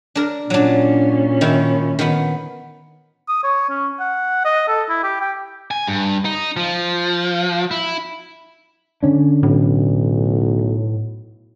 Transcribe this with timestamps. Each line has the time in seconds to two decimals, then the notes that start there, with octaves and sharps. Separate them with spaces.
0.15 D4 A#4
0.50 A#2 F#3 C#4 D4
1.41 D#3 E4
1.99 D#3 B3
3.28 D#6
3.43 C#5
3.69 C#4
4.00 F#5
4.45 D#5
4.68 A4
4.89 E4
5.03 G4
5.21 G5
5.71 G#5
5.87 G2
6.25 D#4
6.57 F3
7.71 E4
9.03 D3 C#4 D4
9.43 B1 A2